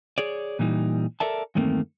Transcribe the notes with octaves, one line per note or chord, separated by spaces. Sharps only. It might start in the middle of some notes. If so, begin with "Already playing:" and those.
G#4 C#5 D5
A#2 E3 G3 D#4
A4 A#4 D5 E5 A5
E2 G2 D#3 A3 A#3 C4